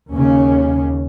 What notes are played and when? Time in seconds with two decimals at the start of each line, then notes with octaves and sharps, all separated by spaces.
0.13 D#2 C#3 C#4